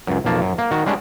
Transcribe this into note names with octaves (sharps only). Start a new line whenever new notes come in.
C#2 F#2
B1 F2 A#3 A5
F#2
A#3
D#3 F#4
G3 G#3 C#4 D4